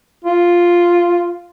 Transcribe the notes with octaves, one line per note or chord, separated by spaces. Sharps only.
F4